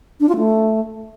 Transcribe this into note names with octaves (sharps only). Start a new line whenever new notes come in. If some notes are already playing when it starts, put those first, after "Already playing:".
D4
F4
A3